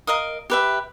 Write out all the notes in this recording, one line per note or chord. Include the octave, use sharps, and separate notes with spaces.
A#4 D#5 F5 D#6
G4 B4 E5